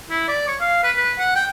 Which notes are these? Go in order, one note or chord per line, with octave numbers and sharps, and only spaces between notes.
E4
D5
C#5
F5
B4
B4
F#5
G5